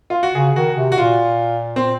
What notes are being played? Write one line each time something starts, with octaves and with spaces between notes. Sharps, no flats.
F4
F#4
C#3 G#4
D#3 F#4
C3
F#4
A#2 F4
C4